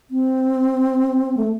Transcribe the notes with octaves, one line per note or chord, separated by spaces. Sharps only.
C4
A3